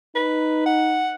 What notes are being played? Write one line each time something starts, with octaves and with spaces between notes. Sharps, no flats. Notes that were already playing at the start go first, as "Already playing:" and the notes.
D#4 B4
F#5